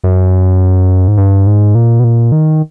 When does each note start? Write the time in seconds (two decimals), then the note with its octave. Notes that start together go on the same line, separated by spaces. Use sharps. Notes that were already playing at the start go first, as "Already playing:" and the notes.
0.04 F#2
1.08 G#2
1.18 G2
1.47 G#2
1.75 A#2
2.00 B2
2.04 A#2
2.32 D#3